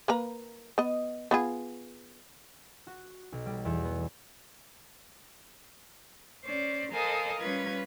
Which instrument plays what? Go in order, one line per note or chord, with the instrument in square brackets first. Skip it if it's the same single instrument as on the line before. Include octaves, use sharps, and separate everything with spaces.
[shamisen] A#3 B4 A#5
B3 D#5
B3 F4 G#4
[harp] F#4
B1
G3
E2
B3
[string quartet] C#4 C5 D5
A4 A#4 C5 D#5 F5 G#5
G3 C#4 F4 B4 G#6